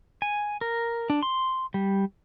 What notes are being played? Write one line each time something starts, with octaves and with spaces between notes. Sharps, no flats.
G#5
A#4
D4
C6
G3